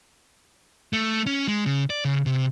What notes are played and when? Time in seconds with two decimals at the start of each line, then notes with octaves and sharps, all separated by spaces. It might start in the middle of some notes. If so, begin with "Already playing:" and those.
0.93 A3
1.26 C#4
1.47 G#3
1.66 C#3
1.90 D5
2.05 C#3
2.26 C3